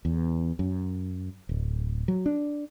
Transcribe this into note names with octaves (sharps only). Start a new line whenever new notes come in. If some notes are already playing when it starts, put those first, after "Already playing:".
E2
F#2
D1
F#3
D4